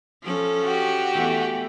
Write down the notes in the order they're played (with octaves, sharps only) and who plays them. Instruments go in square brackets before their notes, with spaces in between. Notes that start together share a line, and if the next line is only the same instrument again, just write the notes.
[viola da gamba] F3 C#4 A4
[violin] F#4 G4
[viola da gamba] E2 E3 A3